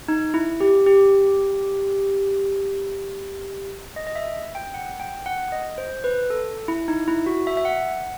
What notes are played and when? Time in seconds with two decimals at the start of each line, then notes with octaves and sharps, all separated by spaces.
0.08 D#4
0.34 E4
0.61 G4
0.87 G4
3.96 D#5
4.07 D#5
4.15 E5
4.55 G5
4.74 F#5
5.00 G5
5.26 F#5
5.52 D#5
5.78 C5
6.04 B4
6.30 A4
6.68 E4
6.88 D#4
7.08 E4
7.26 F#4
7.47 E5
7.57 E5
7.65 F#5